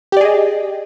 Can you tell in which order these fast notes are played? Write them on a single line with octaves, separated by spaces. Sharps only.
G4 D5 G#4 D#5